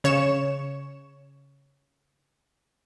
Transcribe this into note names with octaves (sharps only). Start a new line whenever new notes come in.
C#3 C#5 C#7 E7